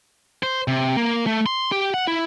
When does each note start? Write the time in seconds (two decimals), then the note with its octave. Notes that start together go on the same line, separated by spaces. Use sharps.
0.43 C5
0.68 C3
0.97 A#3
1.26 A3
1.46 C6
1.72 G4
1.94 F#5
2.07 E4